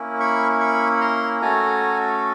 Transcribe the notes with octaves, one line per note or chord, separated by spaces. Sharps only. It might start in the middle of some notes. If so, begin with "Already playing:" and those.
Already playing: A#3 C#4 E4
B5 C#6
B5 C#6
A#5 C6
A3 C#4 F#4 A4 G#5 A#5